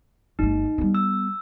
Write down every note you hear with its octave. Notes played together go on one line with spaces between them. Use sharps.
G1 A3 D#4
G3 B3
E6